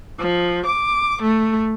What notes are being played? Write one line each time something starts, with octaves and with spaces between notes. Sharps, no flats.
F3
D6
A3